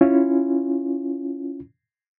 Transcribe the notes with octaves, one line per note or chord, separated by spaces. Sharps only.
C#4 E4 F4